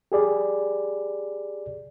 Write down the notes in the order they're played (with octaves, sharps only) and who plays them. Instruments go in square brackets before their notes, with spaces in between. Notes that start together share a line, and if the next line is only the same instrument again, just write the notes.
[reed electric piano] G4 G#4 D5